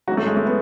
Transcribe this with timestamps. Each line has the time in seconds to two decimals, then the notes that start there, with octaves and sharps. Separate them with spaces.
0.07 A1 G#2 F#3 F#4
0.17 A3
0.26 G#3
0.37 A3
0.46 B3